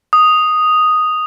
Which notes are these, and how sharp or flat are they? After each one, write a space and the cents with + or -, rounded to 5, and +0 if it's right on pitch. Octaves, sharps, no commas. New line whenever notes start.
D#6 +0